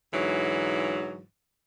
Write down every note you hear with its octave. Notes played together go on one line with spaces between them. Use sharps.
G#2 D3 E3 F#3